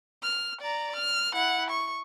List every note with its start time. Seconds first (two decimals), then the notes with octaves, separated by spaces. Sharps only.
0.23 F6
0.61 D5 A#5
0.96 F6
1.33 E4 F#5
1.70 C#6